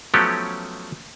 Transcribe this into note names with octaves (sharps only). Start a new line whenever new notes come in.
F3 F#3 A3 B3 C#4 G4